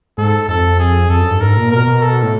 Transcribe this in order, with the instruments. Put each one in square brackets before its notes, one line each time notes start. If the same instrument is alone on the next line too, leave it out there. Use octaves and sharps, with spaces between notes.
[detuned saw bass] G#2 [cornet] A4
[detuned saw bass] F2 [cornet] A4
[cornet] G#4
[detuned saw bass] F2 [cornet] A4
[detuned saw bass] F#2
G2
[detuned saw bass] G#2 [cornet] A#4
[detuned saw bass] A#2
[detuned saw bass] B2 [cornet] A#4
[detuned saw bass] B2
[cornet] A4
[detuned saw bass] A2